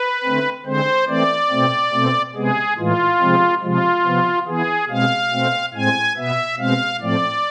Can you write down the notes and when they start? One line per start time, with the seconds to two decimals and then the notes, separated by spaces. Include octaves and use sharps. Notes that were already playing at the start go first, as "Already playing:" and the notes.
Already playing: B4
0.24 D3 A3 C4
0.66 D3 G#3 C4 C5
1.08 E3 A3 C4 D5
1.50 B2 A3 C4
1.93 B2 A3 C4
2.35 C3 G#3 B3 G#4
2.78 A2 E3 G#3 F4
3.20 C3 F3 G#3 C4
3.63 C3 F3 G#3 F4
4.05 C3 F3 B3
4.47 E3 B3 G#4
4.89 B2 G#3 C4 F5
5.31 B2 A3 C4
5.74 A2 G#3 C4 G#5
6.16 B2 B3 E5
6.58 B2 G#3 C4 F5
7.00 A2 F3 A3 C4 D5